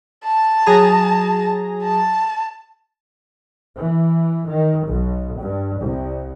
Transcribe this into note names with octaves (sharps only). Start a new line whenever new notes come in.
A5
F#3 G#4 A#5
A5
E3
D#3
B1
G2
C2